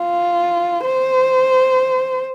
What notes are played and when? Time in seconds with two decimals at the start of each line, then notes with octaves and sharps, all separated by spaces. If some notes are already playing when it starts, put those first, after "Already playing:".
Already playing: F4
0.85 C5